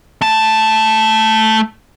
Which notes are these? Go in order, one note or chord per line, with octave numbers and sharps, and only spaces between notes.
A3 A5